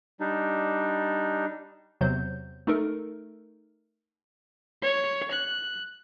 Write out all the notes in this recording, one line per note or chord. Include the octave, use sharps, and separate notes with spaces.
G3 D4 D#4
E2 C3 F#3 C5 G6
A3 D#4 A4 A#4
C#5
F#6